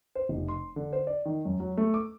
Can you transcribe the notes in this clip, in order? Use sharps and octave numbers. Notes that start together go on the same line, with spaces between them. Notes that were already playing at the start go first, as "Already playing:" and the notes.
C5
F1
C6
D3
C5
D5
D#3
F#2
F#3
A3
D6